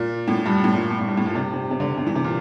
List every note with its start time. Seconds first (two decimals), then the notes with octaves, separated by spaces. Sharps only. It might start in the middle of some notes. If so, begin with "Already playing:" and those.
Already playing: A#2
0.27 A2
0.46 G2
0.64 A2
0.73 A#2
0.90 A#2
0.99 A2
1.08 G2
1.17 A2
1.26 A#2
1.35 C3
1.53 C3
1.71 C3
1.80 D3
1.97 C3
2.07 E3
2.15 C3
2.24 A#2